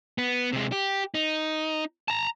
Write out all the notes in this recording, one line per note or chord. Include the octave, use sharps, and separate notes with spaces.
B3
C3 G#3
G4
D#4
A5 A#5